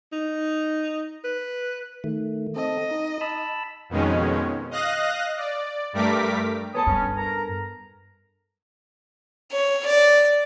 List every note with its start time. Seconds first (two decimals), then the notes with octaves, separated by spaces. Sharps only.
0.13 D#4
1.25 B4
2.04 D#3 A3
2.56 C4 A4 D#5
2.91 D#4
3.21 A5 B5 E6
3.89 F2 B2 D#3 G#3 C#4
4.71 D#5 F5 D#6 F#6 A#6
5.37 D5
5.93 G2 G3 A3 A#4 D6 B6
6.74 B3 A4 C#5 G#5 A5 D#6
6.87 G2 C#4
7.16 A#4 A#5
9.53 C#5
9.86 D5